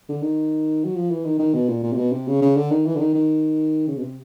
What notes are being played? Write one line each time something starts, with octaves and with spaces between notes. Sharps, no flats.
D3
D#3
F#3
F3
E3
D#3
D#3
B2
A#2
A#2
C3
B2
C3
C#3
C#3
D3
D#3
E3
D3
D#3
D#3
C#3
B2
C3